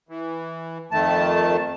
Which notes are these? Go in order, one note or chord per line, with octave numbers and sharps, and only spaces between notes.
E3
F2 D#3 A3 A5